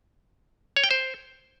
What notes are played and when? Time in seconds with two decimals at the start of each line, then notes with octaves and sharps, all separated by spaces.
0.77 C#5
0.84 G5
0.91 C5